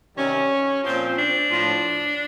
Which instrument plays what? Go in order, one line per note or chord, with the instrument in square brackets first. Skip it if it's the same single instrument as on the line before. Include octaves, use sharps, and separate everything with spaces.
[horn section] C3 D#3 G3 C#4
A#2 F3 C4
D4
A2 F3